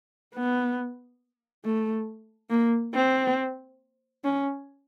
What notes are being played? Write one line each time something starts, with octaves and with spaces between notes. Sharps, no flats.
B3
A3
A#3
C4
C#4